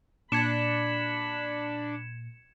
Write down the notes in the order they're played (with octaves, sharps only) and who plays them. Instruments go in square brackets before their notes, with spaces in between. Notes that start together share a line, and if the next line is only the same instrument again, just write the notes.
[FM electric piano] A#2 [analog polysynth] D4 [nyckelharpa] B5 [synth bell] G#6 C#7 E7